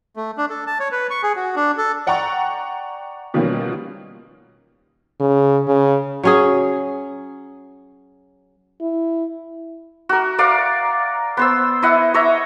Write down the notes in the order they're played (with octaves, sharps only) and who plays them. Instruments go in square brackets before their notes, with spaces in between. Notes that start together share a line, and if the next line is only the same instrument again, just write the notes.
[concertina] A3
D4
A4
A5
C#5
B4
C#6
G#4
F#4
D4
A4
[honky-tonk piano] D5 F#5 G5 A#5 C#6 A6
B2 D#3 F3 G3 A#3 C#4
[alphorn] C#3
C#3
[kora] F#3 C#4 G#4
[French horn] E4
[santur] F#4 A#4
A#4 D5 F5 F#5
B3 C5 E6
E4 D#5 F#5
C#5 D#5 E5 A#5